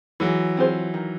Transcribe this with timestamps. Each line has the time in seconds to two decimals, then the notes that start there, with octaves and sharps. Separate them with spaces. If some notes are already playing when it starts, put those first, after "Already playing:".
0.20 E3 F#3 G#3
0.57 C4 F4 G#4 C5
0.94 D#3